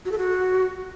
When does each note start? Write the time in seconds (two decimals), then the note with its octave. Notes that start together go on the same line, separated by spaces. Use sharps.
0.05 F#4
0.12 A4
0.18 F#4